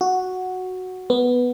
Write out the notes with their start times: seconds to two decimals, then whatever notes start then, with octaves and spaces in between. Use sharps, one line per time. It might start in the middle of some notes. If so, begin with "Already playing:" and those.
0.01 F#4
1.10 B3